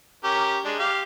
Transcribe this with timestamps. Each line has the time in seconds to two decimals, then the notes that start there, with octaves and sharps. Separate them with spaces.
0.24 C#4 G4 A#4
0.65 G#3 D4
0.79 G4 F5